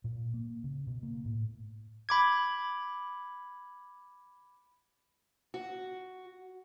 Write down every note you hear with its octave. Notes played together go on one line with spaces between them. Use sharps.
A#2
A#3
C#3
B2
A#3
A2
B5 D6 G#6
F#4